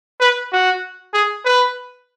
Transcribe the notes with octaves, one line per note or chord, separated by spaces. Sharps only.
B4
F#4
G#4
B4